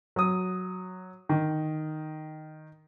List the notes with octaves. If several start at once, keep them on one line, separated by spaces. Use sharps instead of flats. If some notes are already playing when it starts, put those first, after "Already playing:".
F#3 D#6
D#3